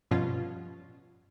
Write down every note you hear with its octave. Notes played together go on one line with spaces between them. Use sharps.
G2 B2 F3 C#4 F4